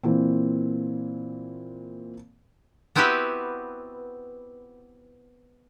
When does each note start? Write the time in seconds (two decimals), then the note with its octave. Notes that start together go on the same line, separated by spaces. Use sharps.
0.03 A#2 E3 C4
2.95 B3 C4 E4 F#4 G4 B4